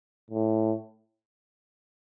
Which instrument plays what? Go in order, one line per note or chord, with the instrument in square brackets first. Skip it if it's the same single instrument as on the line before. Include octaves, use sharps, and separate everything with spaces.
[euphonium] A2